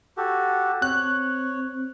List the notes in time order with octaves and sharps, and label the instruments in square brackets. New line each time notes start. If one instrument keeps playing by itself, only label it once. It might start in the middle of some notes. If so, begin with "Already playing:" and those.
[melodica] F#4 G4 A4
[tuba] C4 [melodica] C#5 [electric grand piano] F#6